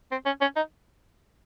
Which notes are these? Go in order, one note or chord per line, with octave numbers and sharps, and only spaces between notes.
C4
C#4
C#4
D#4